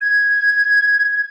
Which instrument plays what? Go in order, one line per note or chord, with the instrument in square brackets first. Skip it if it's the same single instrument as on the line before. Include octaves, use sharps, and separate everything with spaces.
[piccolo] G#6